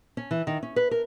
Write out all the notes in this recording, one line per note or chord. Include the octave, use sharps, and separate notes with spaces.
C#4
E3
D#3
C#4
B4
A#4